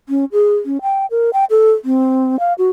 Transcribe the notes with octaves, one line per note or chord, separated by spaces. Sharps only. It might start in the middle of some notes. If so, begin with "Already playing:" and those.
C#4
G#4
C#4
G5
A#4
G5
A4
C4
F5
F#4